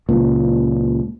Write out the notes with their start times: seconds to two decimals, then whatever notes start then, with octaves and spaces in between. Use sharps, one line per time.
0.09 C#2 A#2